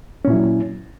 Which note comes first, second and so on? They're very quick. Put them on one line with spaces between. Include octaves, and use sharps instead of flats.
C#4 A#2 E4 F#3